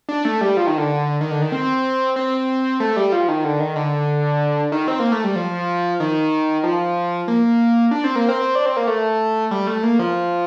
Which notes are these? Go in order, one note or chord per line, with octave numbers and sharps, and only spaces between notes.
D4
A3
G3
F3
D#3
D3
D#3
D3
D#3
C4
C4
A3
G3
F3
D#3
D3
D#3
D3
D#3
C4
A#3
A3
G3
F3
D#3
F3
A#3
D4
C4
A#3
C4
D4
C4
A#3
A3
G3
A3
A#3
F3